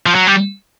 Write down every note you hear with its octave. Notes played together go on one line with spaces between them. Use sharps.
F3
F#3
G3